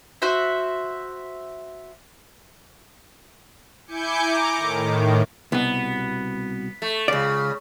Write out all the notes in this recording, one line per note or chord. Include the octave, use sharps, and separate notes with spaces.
F#4 C5 E5
E4 G#5 D6 G6 C#7
A#5 D6
A2 D#3
C2 B2 B3
A3
C#2 C#3 D5